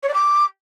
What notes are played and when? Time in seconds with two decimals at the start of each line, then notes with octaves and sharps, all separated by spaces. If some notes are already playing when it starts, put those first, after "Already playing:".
0.02 C#5
0.08 D5
0.13 D6